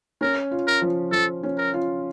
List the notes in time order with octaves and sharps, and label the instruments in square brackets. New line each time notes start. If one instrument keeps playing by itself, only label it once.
[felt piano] C#4 [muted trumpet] A#4
[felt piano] F4
[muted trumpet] A#4
[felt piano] F3
[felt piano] F3 [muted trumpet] A4
[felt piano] C#4
[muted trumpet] A#4
[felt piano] F4